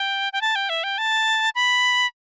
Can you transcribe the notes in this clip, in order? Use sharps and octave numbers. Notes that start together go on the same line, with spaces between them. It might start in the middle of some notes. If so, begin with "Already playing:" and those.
Already playing: G5
G5
A5
G5
E5
G5
A5
B5